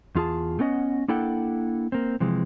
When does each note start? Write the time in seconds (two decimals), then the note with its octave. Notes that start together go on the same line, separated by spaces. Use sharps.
0.15 E2 F4 G#4 A5
0.59 A3 B3 C#4 D#5 F#5
1.08 A#3 D4 E4 A4 F#5 G5
1.92 A#3 C4
2.20 C3 E3 F3 G#3